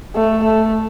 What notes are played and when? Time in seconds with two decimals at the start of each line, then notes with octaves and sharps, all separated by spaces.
0.15 A3
0.44 A3